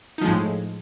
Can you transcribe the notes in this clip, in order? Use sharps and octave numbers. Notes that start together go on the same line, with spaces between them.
A2 F3 G#3 D#4